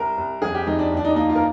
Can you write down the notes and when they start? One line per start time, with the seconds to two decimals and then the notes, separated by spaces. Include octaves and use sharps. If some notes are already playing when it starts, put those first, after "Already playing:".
Already playing: C2 A#4
0.18 C2
0.42 F2 G#4
0.55 G4
0.67 F2 D#4
0.79 D4
0.92 D#2
0.97 D4
1.05 D#4
1.11 D4
1.16 A#3 D#4
1.29 F4
1.35 A#4